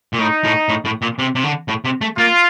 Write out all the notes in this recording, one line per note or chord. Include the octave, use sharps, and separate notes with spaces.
A#2
A2 D#4
A2
A2
A2
A#2
C3
C3
D3
A2
C3
A3
A#3 F4